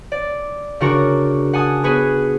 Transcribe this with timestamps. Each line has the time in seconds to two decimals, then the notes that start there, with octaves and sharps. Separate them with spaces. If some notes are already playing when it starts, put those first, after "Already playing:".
0.12 D5
0.80 C#3 D4 F#4 A#4 C#6
1.53 F#5 G#5 A5 D#6
1.84 B3 F#4 G#4 B4